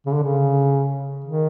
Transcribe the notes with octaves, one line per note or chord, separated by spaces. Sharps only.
C#3
D3
C#3
D#3